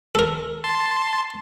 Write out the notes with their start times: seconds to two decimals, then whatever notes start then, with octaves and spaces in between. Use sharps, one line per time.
0.15 A4 A#4
0.64 A5 C6